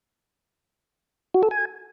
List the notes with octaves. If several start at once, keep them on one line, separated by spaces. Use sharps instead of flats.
F#4
A4
G#5